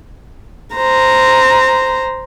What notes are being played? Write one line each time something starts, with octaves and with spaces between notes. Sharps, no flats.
C5 A#5